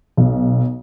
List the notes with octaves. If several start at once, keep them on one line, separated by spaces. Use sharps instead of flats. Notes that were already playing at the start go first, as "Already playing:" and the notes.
B1